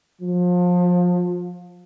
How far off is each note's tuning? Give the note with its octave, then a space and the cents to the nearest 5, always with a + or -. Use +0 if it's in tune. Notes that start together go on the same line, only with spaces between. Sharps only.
F3 +30